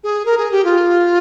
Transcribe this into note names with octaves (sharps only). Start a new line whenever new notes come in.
G#4
A#4
G#4
G4
F4